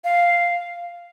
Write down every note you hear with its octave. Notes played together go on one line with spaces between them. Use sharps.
F5